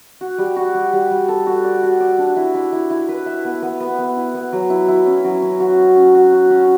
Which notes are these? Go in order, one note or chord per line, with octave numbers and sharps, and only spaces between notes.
F#4
G3
F#4
G3
G3
G3
A4
F#4
D5
F#4
D5
D4
E4
E4
E4
E4
B4
E5
B3
B3
B3
B3
E4
B3
F#3
E4
E4
C#4
F#3
C#4
F#4
C#4
C#4
F#4
F#4
C#4